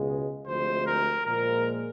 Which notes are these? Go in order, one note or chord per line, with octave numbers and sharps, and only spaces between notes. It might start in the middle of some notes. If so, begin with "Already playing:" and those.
Already playing: C#2 B2 G#3
D2 C3 F3 G#3 C5
A#4
A#2 F3 G#3 A#4